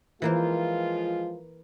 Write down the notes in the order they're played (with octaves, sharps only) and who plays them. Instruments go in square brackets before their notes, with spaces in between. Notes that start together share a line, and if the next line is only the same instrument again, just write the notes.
[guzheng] E3 A#3 C5 [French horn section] F3 G#3 F4